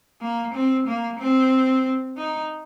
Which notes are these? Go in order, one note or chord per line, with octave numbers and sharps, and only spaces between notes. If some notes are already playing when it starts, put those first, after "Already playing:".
A#3
C4
A#3
C4
D#4